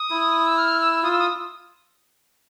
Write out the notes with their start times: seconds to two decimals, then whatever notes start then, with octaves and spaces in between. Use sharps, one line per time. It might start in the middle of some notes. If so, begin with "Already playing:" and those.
Already playing: D#6
0.10 E4
0.46 E6
0.57 F6
0.81 E6
1.03 F4 D#6
1.11 E6
1.18 D#6